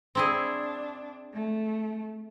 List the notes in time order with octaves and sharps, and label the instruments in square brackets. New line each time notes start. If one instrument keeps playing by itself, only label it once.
[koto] C4 E4 G#4 [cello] D4
[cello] A3